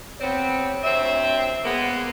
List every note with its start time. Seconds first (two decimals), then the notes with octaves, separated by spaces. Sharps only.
0.21 G3 B3 C4 C#5
0.84 D2 C4 E5
1.64 G#3 A#3 B3